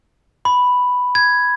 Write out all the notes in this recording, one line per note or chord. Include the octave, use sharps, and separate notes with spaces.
B5
G#6